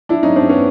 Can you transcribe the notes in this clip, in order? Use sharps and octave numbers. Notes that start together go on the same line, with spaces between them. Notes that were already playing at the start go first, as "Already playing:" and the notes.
D4 E4
C#4 D#4
C4 D4
B3 C#4